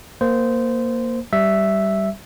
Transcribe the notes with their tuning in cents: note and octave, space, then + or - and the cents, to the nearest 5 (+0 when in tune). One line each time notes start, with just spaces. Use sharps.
A#3 +0 C5 -15
G3 -10 E5 +0